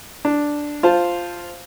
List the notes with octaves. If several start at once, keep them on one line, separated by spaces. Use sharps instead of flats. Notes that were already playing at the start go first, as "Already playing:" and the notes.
D4
F4 C5 A5